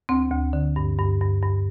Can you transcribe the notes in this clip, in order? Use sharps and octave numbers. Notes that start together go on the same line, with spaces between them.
D2 C4
D2
D3
G2
G2
G2
G2